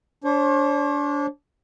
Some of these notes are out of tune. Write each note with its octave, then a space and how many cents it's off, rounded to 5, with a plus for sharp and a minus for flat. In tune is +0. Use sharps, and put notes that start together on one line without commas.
D4 -25 C5 +45